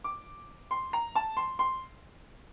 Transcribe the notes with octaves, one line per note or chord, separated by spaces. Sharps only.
D6
C6
A#5
A5
C6
C6